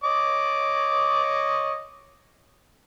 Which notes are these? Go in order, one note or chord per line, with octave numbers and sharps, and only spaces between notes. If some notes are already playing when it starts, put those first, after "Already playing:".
C#5 D#5 D6